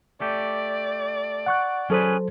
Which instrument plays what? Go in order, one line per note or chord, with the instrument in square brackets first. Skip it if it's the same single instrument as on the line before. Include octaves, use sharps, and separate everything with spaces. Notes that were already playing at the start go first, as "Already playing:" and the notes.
[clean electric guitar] A3 G4 [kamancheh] D5
[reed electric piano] F#5 C#6 F#6
[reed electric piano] F#3 A4 C5 [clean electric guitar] C#4 G#4 B4